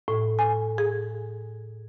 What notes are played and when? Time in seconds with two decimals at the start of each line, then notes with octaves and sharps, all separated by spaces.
0.08 A2
0.39 G#5
0.78 G#4